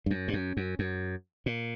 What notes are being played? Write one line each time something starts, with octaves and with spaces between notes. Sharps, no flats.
G2
F#2
G2
F#2
F#2
F#2
A#2